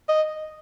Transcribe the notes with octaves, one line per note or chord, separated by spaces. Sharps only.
D#5